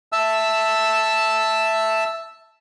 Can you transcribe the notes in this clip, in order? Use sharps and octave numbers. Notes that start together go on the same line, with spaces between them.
E5 A5 E6